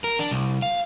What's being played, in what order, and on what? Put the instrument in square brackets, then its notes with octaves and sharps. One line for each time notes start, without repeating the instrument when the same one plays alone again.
[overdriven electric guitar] A#4
D4
C2
F5